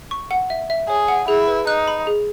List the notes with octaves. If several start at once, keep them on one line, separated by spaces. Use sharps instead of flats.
C#6
F#5
E5
E5
G#4 C#5
F#5
E4 G#4
B4
D#4 F#6
B5
G#4